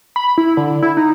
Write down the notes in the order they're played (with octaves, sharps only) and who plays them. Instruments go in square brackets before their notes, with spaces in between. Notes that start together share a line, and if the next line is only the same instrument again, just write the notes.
[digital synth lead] B5
E4
D3
E4
D#4